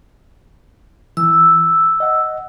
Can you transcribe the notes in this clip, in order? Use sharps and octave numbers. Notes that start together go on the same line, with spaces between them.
E3 E6
D#5 F#5